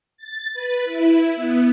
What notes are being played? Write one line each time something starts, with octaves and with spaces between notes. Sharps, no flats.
A6
B4
E4
B3